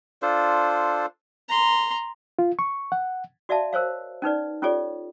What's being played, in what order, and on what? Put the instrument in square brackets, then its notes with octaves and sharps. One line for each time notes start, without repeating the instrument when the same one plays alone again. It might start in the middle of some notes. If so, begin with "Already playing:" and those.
[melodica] D4 F4 A4 C5
[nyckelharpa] A#5 C6
[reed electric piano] F4
C#6
F#5
[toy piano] F#4 D5 E5 F5 A5
A#4 C5 C#5 F5
C#4 D#4 B4 D5
C#4 F4 G4 A4 C#5 D5